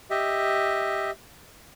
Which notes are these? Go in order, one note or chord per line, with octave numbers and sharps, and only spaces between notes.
G4 D#5 E5